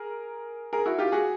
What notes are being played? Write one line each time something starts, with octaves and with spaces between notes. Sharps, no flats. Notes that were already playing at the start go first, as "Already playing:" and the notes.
Already playing: G#4 A#4
G#4 A#4
E4 F#4
F4 G4
F#4 G#4